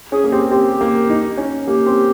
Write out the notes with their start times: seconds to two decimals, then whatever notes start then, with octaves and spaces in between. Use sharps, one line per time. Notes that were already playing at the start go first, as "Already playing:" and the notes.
0.12 C#4 G#4
0.24 A#3
0.32 C4 G4
0.51 C4 G4
0.81 A#3
1.10 D#4
1.37 C#4
1.67 A#3 G4
1.86 C4